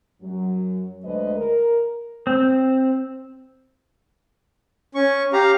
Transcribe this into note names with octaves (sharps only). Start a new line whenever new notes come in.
F#2 F#3
D2 G#3 B4 C5 D#5
A#4
C4
C#4 C#6
G4 F5 A#5